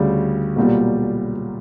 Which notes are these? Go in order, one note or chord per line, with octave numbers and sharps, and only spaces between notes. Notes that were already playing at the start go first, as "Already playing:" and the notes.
Already playing: D2 C#3 G3
B1 A#2 G3